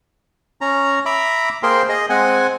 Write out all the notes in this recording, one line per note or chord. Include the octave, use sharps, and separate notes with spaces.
C#4 A#5
E5 A#5 B5 D6
A#3 G#4 A#4 C5 G5 C6
G#4 D#5
G#3 C4 F#5 G#5